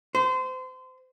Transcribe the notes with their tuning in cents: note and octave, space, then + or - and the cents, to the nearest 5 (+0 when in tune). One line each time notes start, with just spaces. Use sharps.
C5 -30